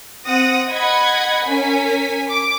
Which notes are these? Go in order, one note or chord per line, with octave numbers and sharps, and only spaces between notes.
C4 F#5 D#6 A#6
D#5 F#5 B5 G#6
C#4 A#4 G#5 B6
D6